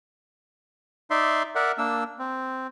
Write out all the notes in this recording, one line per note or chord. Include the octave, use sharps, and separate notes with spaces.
D#4 D5 E5 C6
A#4 D5 E5 F#5
A#3 D4 E6
C4